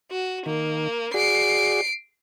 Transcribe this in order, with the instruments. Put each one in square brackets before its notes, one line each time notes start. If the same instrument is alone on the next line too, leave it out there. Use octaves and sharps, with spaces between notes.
[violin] F#4
[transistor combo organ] D#3 [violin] A#3
[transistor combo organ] F#4 G#4 D5 [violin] C7 D7